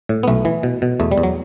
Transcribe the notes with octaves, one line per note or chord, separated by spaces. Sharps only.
A2
B3
B1 A3
E3
B2
B2
E2 A3
G3
E2
F#3